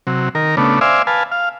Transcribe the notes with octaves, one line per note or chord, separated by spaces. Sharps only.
C3 F#3
D#3 A#4
C#3 A3 B3 D4
C5 D5 E5 F5 G#5
B4 F5 G#5 A5
F5